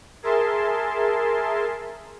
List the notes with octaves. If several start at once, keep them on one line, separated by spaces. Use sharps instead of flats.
G#4 A#4 E5 A5 C6